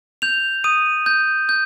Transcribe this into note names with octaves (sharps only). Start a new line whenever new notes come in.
G6 F7
D#6 D#7
G6
G6